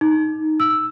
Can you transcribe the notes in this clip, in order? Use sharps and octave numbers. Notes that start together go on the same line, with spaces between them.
D#4
E6